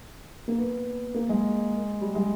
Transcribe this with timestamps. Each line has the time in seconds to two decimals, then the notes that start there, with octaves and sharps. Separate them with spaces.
0.48 A#3
0.57 B3
1.14 A#3
1.29 G#3
2.01 G3
2.15 G#3